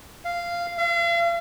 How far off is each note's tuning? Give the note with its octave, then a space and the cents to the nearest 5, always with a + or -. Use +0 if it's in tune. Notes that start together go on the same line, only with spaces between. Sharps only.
F5 -10
F5 -40